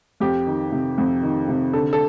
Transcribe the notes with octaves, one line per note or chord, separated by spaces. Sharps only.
F2 G4
D#3
C3
F2
D#3
C3
D3 A4
A4